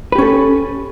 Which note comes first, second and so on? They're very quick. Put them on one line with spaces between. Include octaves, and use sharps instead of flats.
B4 G4 C#4 A4